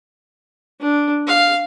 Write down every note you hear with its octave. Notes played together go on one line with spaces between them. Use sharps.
D4
F5